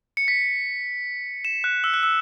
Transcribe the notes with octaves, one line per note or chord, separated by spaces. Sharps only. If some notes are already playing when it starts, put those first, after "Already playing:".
C#7
B6
E7
F#6
E6
F#6
E6